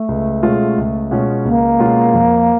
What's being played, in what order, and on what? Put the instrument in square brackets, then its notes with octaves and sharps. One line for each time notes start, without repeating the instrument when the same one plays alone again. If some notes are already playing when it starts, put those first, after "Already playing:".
Already playing: [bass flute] A3
[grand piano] C#2
B2 G#3 C#4 F4
C#2
B2 G#3 C#4 F4
[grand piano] C#2 [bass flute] A#3
[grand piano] B2 G#3 C#4 F4
F2